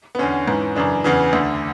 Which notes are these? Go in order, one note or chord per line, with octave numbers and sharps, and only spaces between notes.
B3
E2 D3 C#4
G#2 E3
F#2 C#3 E3 D4
E2 C#3 E3
D2 D3